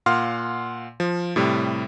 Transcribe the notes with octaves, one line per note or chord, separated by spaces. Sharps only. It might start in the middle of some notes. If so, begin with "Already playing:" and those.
A#2 F5 F#5 C6 F6
F3
A2 C3 G3